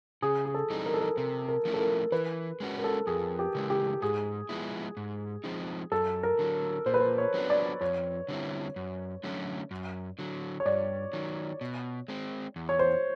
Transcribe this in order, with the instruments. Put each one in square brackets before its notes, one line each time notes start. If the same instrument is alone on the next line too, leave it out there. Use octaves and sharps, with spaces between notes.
[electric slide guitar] C#3 [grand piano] G#4
[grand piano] G#4
A4
[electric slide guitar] E3 G3 C4 D#4
[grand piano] A#4
A4
A#4
[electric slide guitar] C3 [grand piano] A#4
[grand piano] A#4
[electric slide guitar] F3 A3 C#4 E4
[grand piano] A4
A#4
[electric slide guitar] E3 [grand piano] B4
[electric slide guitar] G#3 C#4 F#4
[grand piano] A#4
A4
[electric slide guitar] F2 [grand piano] G#4
[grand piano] G4
[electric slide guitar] C#3 E3 G#3
[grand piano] G4
[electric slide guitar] G#2 [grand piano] G#4
[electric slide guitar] F3 G#3 B3 E4
G#2
F3 G#3 C4 D#4
[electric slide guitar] F#2 [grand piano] A4
[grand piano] A#4
[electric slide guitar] D3 F#3
[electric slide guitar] A#2 [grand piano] C5
[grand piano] B4
C5
C#5
[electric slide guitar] F#3 B3 D4
[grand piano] D5
[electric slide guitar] F2 [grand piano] C#5
[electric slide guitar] D3 G3 C4 E4
F#2
D3 F#3 A3 C#4
F#2
D3 F#3
[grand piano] C#5
[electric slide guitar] G2 [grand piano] D5
[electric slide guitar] D#3 F#3
B2
G#3 C4
E2
[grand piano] C#5
C5